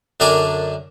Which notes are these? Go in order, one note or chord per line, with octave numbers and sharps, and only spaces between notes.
F#2 D3 D4 A#4 G#5 D6